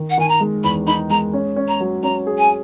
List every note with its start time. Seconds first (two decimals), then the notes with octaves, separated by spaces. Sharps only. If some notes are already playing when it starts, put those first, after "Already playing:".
Already playing: D#3
0.10 F#5
0.17 D#3 G#5
0.29 A#5
0.40 G#3
0.64 E2 B5
0.86 D#4 B5
1.10 G#3 A#5
1.33 C#4
1.56 C#4
1.68 A#5
1.80 F#3
2.03 C#4 A#5
2.27 G#4
2.38 G#5